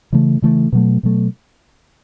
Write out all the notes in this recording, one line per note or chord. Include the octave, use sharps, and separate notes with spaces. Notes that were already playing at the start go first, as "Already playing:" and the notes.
C#3 E3 A3
C#3 E3 A3
B2 F#3 A3
B2 F#3 A3